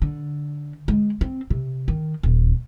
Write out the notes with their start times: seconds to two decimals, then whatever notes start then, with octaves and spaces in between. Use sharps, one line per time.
0.02 D3
0.88 G#3
1.21 C4
1.50 C3
1.88 D#3
2.23 D#1